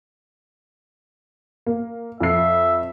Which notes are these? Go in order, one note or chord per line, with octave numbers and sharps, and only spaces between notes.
A#3
F2 E5 C7